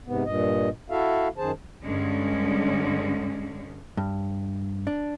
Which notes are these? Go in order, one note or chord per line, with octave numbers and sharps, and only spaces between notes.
G#2 C3 B3
G2 A#2 D#5
E4 F#4 A4 E5 F5
F#2 D#3 G#4 C5 A5
G2 D3 G#3 C#4
G2
D4